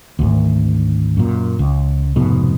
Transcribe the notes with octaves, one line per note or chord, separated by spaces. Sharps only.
G#1 D2
F#2 A#2
C#2
F1 G#2 B2